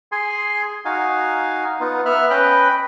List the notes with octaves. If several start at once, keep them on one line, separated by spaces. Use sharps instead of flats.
G#4 G#5 C6
D#4 F#4 F5 G#5
B3 D#4 F4
B3 E5 F6 F#6
C#4 B4 D#5 G5 B5 F#6